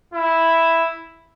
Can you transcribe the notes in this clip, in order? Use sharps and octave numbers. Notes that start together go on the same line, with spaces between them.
E4